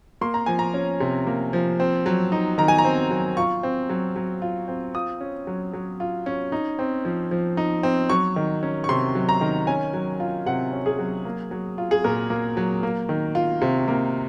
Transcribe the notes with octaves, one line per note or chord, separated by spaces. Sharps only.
A#3 C6
A#5
F3 G#5
A#5
C#4
C3
A#3
F3
C4
F#3
D#4
D#3 A#5
G#5
A#5
C4
F#3
F4 C#6
C4
F#3
F#3
F4
C4
F4 D#6
C#4
F#3
F#3
F4
C#4
D#4
C4
F3
F3
D#4
C4
F#3 C#6
D#3
C#4
C#6
C3 C6
F#3
A#5
D#3
C#4 G#5
F#3
F4
C3 F#5
C#4
G#4
F#3
A#3
F#3
F4
G#4
A#2 A#4
A#3
F#3
A#3
D#3
F4
C3
A#3